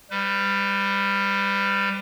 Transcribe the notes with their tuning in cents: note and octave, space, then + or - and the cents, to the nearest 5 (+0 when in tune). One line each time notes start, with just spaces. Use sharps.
G3 +15 B4 +40